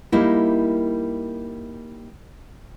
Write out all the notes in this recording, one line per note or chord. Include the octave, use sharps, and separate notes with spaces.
G3 A#3 D#4 E4